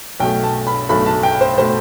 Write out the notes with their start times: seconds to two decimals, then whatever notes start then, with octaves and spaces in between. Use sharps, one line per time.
0.20 B1 B2 A3 G5
0.43 A5
0.67 B5
0.89 B1 B2 A3 B5
1.06 A5
1.23 G5
1.41 C5
1.58 B2 A3 C5